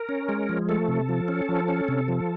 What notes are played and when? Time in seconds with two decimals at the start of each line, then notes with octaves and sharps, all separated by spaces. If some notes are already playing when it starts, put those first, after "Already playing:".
Already playing: A#4
0.09 C#4
0.29 G#3
0.49 F3
0.69 A3 A4
0.88 C3
1.09 F3
1.28 C#4
1.49 F3
1.68 C#4
1.88 C3
2.08 F3